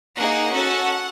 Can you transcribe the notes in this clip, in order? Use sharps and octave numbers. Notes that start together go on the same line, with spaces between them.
A#3 D#4 G#4 F#5
C#4 F#4 A4